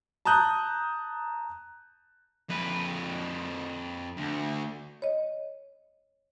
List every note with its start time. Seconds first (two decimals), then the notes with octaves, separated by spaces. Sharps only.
0.25 A5 A#5 D#6 F#6 G6
2.49 F2 B4
4.17 D2
5.02 C#5 D#5